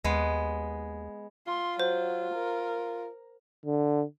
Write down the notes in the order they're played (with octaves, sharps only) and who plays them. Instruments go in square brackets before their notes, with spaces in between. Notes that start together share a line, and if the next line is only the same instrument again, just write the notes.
[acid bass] D#2 [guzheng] G#3 B3
[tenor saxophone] F4 [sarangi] C6
[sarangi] F#3 [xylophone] C5
[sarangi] A#4
[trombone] D3